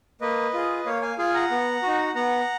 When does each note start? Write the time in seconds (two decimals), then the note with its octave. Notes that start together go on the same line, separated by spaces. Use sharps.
0.21 A#3 B4 D#5
0.54 F4 G#4
0.86 A#3 C#5 F5
1.02 F5 G#5
1.18 F4 G#4 F5 G#5
1.34 F#5 A#5
1.51 B3
1.83 D#4 F#4
2.15 B3 F#5 A#5